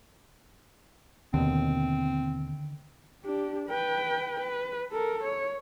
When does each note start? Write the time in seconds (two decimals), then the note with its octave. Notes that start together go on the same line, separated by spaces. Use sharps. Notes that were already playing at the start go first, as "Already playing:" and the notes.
1.34 D#2 B2 D3 D#3 C4
3.24 D4 G4
3.68 B4 G5
4.40 B4
4.92 A4 A#4
5.24 C#5